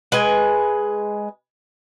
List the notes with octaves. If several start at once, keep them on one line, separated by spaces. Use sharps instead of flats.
G#3 B4 G#5